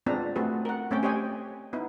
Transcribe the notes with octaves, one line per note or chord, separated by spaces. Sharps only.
G#3 B3 C4 D4 F4 A#5
A3 C4 F#4 G#4 B4
A#4 F#5
A3 C4 C#4 C#5 G5
G4 C5 C#5 D#5 G5 G#5
B3 D#4 E4